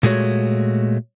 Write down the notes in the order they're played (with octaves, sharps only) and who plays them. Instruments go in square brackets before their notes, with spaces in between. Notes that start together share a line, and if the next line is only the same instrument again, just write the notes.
[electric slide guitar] A#2 G#3 A3 F#4 C#5